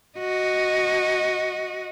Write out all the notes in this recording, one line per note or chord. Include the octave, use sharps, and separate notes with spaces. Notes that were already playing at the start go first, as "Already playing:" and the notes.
F#4 D#5